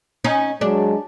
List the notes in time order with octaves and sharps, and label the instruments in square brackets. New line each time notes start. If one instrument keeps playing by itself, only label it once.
[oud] C#4 D#4
[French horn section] F#3 G#3 [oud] D4